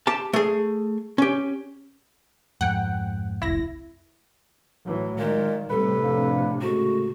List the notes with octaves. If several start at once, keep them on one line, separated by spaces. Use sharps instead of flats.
G4 A5
A3 G#4
C#4 G4
F2 G#2 F#5 G5
F1 C2 E4 A#6
A2 E3 F#3
A#2 D#3 G#3
A2 C3 G3 A4 B4
F2 D4 F5
C#3 G#3 A3 F#4